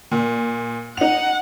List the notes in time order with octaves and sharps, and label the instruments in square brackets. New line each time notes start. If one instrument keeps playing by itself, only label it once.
[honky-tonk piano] A#2
[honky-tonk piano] D#4 F7 [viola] F#5